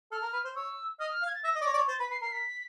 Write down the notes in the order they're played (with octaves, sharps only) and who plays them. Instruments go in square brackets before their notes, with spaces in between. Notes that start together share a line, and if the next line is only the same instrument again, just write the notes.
[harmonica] A4 [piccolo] F6
[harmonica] A#4
B4
C5
[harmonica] C#5 [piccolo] E6
[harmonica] D#5 [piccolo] F6
[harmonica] F5
[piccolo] G#6
A6
[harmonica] E5 [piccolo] A#6
[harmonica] D#5
D5
C#5
D5
C#5
[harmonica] C5 [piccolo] A6
[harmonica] B4 [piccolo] B6
[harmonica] B4 [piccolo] C7
[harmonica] A#4 [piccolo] C7
[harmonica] A#4 [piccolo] B6